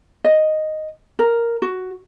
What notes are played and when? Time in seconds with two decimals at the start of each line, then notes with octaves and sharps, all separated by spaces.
0.24 D#5
1.19 A#4
1.62 F#4